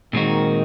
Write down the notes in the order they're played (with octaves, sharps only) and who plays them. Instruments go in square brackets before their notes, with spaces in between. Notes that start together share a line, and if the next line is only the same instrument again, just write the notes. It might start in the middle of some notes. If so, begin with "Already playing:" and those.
[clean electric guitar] A#2 G#3 C4 D#4 F#4 [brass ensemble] D#3